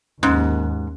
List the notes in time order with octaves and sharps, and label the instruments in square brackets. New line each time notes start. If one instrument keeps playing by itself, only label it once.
[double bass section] D#2 [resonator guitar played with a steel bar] G#2 [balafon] C#4